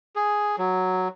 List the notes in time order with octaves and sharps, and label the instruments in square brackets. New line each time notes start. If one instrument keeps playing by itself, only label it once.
[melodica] G#4
F#3